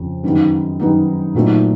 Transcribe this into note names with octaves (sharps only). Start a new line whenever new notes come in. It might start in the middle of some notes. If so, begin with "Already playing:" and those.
Already playing: F2 C#3
F#2 D#3 G3 B3 D#4
F#2 D#3 G3 B3 D#4
A#2 F#3 A3 C4 D#4